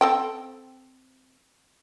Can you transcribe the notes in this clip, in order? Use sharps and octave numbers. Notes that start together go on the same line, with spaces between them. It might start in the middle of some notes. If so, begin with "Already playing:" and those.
C4 A4 G5